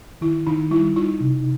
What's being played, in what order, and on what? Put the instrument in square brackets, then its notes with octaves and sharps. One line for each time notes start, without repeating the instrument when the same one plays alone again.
[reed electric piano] D#3 [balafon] E4
[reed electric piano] D#3 [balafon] D#4
[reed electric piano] G3 [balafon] E4
[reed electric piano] D#4 [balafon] F4
[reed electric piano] C3